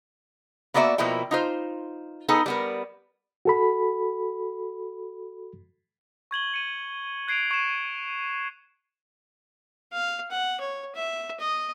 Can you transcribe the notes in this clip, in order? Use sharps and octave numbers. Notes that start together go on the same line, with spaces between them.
A#3 B3 F#4 D5 E5
B2 F3 A#3 E4 G5
D#4 F4 C5
B3 D#4 G#4 A4 B4
G3 B3 A#4
F#4 A4 B5
C#6 G#6 F#7 G7
C#7 D#7
F#6 G#6 C7 D7 D#7 F7
C#6 G#6 C#7 D#7 E7
F5
F#5
C#5
E5
D#5